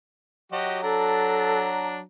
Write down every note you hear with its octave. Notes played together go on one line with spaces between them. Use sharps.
F#3 F#4 G4 D#5
D4 A4 A#5